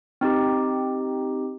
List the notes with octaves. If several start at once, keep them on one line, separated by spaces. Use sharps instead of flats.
C4 D#4 G4